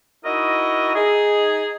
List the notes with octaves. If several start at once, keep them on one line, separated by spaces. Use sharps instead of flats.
D#4 E4 F#4 A#4 D#5
D#4 G#4